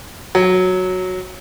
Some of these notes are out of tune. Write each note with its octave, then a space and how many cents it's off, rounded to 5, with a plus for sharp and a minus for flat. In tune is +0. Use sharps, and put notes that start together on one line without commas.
F#3 -5